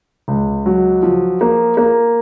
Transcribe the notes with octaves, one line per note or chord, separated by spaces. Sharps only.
C#2
F#3
F3
A#3
A#3